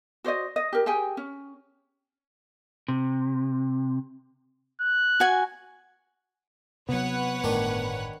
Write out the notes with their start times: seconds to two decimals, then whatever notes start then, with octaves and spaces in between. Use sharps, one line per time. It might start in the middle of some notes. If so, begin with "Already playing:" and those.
0.24 F#4 C5 D5 D#5
0.56 D#5
0.73 G4 A#4
0.86 G4 G#4 G5 G#5
1.17 C#4
2.88 C3
4.81 F#6
5.20 F#4 G#5
6.89 C3 F#3 B3 B4 C#5 F#5
7.44 G1 A2 D#3 A3 D4